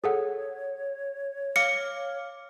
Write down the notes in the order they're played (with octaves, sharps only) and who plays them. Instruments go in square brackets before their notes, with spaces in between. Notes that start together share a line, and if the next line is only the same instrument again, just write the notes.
[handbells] G#4 A4 F#5 [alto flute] C#5
[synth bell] F5 D6 F6 [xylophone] C#7